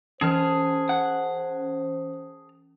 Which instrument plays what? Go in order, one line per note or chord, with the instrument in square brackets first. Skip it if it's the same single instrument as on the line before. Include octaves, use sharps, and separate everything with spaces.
[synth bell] E3 C#4 [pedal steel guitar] G#4 A5 F6 [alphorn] C5
[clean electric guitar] F#5